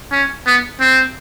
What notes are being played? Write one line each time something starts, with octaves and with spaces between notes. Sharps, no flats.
C#4
B3
C4